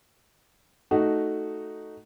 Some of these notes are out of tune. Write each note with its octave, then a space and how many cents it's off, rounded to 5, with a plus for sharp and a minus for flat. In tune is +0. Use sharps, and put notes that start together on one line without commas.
A3 +0 D#4 -5 F#4 +0